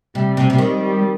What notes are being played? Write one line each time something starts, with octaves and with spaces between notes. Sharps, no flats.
C3 G3
C3
C3 G3
D#3
G3